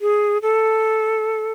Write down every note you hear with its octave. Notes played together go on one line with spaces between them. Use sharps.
G#4
A4